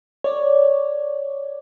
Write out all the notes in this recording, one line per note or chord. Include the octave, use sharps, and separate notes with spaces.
C#5 D5